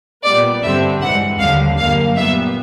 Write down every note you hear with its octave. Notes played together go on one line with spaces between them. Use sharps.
A#2 G3 B3 D5
G2 D3 G3 C4 E5
G2 E3 G#3 F#5
D#2 D3 G3 F5
F#2 D3 G3 A#3 F5
A#2 G3 B3 E5